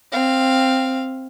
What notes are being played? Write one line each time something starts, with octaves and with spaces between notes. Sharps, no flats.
C4 F5